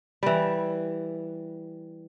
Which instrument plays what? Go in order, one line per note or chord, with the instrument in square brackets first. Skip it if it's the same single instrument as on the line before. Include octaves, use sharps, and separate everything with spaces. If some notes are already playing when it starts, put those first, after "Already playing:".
[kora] E3 G3